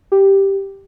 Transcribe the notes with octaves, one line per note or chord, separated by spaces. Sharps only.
G4